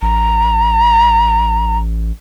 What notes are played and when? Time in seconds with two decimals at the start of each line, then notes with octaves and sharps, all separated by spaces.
0.02 A1 A#5